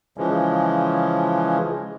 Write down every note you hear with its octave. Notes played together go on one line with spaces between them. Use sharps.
C#3 E3 F3 G#3